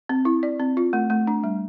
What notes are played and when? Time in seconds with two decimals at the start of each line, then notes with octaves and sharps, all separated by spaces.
0.09 C4
0.25 E4
0.43 D5
0.59 C4
0.77 F4
0.93 A3
1.10 A3
1.27 D4
1.44 G3